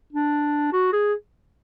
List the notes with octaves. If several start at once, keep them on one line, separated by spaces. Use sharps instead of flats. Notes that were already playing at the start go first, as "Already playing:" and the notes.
D4
F#4
G#4